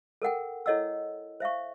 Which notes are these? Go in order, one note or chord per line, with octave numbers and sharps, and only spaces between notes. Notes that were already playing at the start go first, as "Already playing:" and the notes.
A4 A#4 F#5 G5
E4 A4 C#5 D#5 F#5 E6
C5 E5 F5 C#6